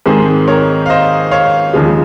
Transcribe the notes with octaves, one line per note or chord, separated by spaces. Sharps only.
G#2 D#3 G#3 C4 G#4 C5
A#4 C#5
F5
C5 D#5
C#5 F5
D#2 C#3 F3 G#3